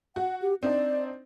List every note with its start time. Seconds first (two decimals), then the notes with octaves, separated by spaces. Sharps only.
0.16 F#4 F#5
0.42 G4
0.63 C4 D4 D#4 D5